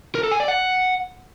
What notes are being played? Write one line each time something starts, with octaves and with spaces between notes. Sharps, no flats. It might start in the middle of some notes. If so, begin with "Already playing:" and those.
A#4
A4
G#5
D5
F#5